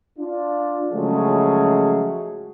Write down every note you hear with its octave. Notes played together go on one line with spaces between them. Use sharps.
D4 F4
C#3 F3 F#3 G#3 A3 G#4